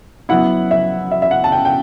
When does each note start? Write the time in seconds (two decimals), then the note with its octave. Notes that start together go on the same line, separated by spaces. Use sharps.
0.29 F#3 B3 E4 F#5
0.71 E5
1.11 E5
1.22 E5
1.31 F#5
1.44 A5
1.52 G5
1.65 G5